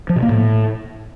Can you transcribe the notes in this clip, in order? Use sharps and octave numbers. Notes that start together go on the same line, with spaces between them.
F3
B2
A#3
A2